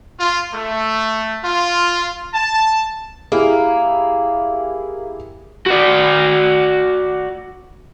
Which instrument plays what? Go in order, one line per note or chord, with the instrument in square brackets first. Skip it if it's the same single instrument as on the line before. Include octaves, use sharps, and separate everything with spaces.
[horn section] F4
A3
F4
A5
[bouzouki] A#3 [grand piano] E4 G4 G#4
[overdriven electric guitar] F#4 D5